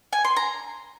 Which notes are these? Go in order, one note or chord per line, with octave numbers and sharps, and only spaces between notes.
G#5
C6
A#5